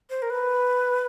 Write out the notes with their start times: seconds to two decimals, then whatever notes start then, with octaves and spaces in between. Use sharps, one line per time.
0.10 C5
0.22 A#4
0.30 B4